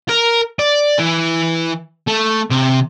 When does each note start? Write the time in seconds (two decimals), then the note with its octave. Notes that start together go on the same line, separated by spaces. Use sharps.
0.09 A#4
0.59 D5
0.99 E3
2.07 A3
2.50 C3